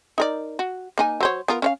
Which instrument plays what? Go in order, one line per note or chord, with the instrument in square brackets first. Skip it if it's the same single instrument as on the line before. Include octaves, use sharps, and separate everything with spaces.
[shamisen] D#4 A#4 D5
F#4
A#3 D#4 G#5
F#3 C5 C#5
B3 F4 A#4
C#4 C#5 F5